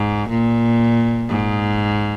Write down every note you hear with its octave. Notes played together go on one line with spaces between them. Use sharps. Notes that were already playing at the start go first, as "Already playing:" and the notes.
Already playing: G#2
A#2
G#2